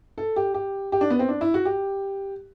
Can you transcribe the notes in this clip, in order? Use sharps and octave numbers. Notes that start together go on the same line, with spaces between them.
A4
G4
G4
G4
D4
B3
C4
D4
E4
F#4
G4